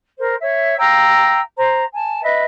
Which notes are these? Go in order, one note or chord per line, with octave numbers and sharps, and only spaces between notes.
A#4 C5
C#5 E5
F5 G5 A#5 E6
C5 A#5
G#5 A5
B4 D#5 E5